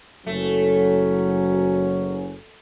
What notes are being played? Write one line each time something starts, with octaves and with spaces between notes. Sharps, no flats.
F#1 F#3 A3 C#4